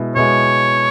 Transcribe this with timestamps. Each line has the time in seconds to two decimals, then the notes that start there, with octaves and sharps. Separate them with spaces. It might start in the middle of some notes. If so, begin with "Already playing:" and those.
Already playing: B2 G#3 E4
0.16 B2 G#3 E4 C#5